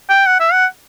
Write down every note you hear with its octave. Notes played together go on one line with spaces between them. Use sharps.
G5
F#5
E5
F#5